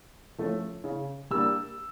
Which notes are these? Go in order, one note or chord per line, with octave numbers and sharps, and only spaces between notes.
F3 A3 C#4
C#3
G3 A#3 D4 E6